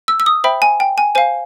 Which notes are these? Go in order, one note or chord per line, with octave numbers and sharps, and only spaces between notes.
E6
E6
D#6
C5 E5 G5 B5
G#5
G5
G#5
C5 F5 G#5